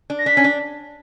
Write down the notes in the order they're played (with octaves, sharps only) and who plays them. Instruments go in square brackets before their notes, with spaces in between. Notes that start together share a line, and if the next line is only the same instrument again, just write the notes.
[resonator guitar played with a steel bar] D4
[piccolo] A#6
[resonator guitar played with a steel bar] D4 [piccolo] B6
[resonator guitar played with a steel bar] C#4
D4